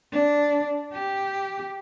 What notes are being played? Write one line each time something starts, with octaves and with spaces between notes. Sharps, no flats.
D4
G4